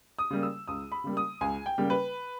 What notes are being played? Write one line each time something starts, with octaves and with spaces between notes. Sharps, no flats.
D#6
C#3 G3 A#3
E6
C#2 D#6
B5
C#3 G3 A#3
D#6
C#2 G#5
G5
C#3 G3 A#3
B4